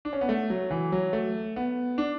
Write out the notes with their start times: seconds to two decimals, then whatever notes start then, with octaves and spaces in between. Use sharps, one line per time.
0.05 D4
0.13 C#4
0.21 B3
0.29 A3
0.50 F#3
0.71 E3
0.92 F#3
1.13 A3
1.56 B3
1.98 D4